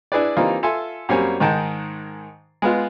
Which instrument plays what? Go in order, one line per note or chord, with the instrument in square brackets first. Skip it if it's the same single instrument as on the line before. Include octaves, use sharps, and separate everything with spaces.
[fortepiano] D4 E4 G#4 B4 D5
E3 G3 A#3 C4 D#4 F4
F4 A4 E5 G#5 C6
F#2 G3 A#3 C4 C#5 G#5
G#2 D#3 G#3 G5 A5
G#3 B3 F4